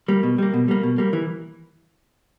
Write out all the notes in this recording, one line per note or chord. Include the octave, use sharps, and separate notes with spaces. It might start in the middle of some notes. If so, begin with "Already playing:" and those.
G3 A#3
B2
G3 A#3
B2
G3 A#3
B2
G3 A#3
E3